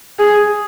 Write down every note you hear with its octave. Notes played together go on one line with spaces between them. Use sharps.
G#4